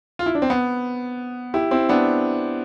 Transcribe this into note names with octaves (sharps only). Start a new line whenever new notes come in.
F4
E4
D4
C4
B3
E4 G4
C4 E4
B3 D4